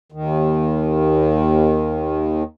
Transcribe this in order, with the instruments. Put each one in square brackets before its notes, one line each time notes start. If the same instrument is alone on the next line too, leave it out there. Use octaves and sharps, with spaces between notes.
[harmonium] D#2 D#3